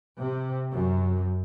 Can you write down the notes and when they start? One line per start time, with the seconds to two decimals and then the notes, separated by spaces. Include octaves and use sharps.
0.19 C3
0.72 F#2